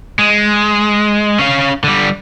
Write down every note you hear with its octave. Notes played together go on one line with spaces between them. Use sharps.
G#3
C#4 F5
D3 G3